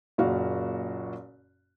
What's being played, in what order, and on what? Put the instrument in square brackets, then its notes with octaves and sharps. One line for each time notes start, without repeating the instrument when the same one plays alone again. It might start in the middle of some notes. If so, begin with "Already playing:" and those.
[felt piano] F#1 A#2 F#4 F5